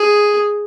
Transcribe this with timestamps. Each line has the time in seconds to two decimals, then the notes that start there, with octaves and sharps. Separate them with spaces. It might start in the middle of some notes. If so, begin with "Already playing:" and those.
Already playing: G#4